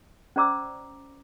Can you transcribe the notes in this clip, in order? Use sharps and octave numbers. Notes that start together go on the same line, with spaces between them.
C#4 C5 D5 A#5 D6 E6